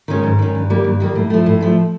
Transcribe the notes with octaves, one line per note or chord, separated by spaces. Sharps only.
D#3 G#3 C#4
G#2
D#3 G#3 C#4
G2
D#3 G3 A#3
G2
D#3 G3 A#3
A2
F3 A3
A2
F3 A3